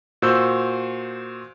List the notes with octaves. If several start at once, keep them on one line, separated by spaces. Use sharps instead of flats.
A#2 F#4 C5 E6 G6